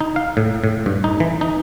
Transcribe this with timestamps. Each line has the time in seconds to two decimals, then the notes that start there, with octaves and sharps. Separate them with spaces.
0.01 D#4
0.16 F5
0.37 A2
0.64 A2
0.86 G2
1.04 D#4
1.20 E3
1.41 D#4